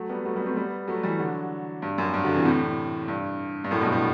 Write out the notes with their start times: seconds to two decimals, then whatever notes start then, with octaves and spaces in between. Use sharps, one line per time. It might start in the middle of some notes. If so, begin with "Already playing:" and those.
Already playing: F#3 A3
0.09 G3 B3
0.25 F#3 A3
0.36 G3 B3
0.46 A3 C4
0.56 G3 B3
0.88 F#3 A3
1.03 E3 G3
1.19 D3 F#3
1.82 G2
1.98 F#2
2.14 G2
2.24 D3 F#3
2.35 C3 E3
2.45 A2 C3
3.08 G2
3.64 G2
3.71 F#2 A2
3.81 G2 B2
3.92 A2